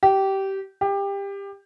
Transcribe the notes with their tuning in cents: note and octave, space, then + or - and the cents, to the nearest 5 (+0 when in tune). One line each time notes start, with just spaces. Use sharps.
G4 -20
G4 +20